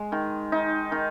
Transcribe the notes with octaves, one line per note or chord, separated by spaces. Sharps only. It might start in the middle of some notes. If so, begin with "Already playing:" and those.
Already playing: G#3
D#3
D#4
D#3